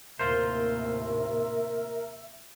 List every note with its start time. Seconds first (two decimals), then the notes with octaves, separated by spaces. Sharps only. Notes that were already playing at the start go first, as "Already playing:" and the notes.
0.19 D#2 A2 C3 F4 A#4 C5 E5